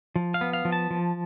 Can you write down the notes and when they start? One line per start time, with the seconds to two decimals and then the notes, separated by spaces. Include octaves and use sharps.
0.16 F3
0.34 F5
0.41 B3
0.53 F5
0.65 F3
0.72 A5
0.91 F3